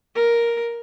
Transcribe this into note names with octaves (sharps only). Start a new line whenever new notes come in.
A#4